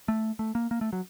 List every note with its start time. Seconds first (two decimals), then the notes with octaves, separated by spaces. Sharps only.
0.08 A3
0.39 A3
0.55 A#3
0.71 A#3
0.81 A3
0.93 F#3